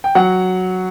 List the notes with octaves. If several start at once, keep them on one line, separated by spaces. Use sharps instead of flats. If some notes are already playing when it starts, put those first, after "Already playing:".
G5
F#3 F#5